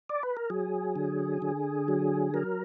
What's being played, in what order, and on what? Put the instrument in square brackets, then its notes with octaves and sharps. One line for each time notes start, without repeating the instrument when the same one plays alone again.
[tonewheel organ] D5
B4
A#4
F#3 G#4
D3
D3
F#3
F#3 A#4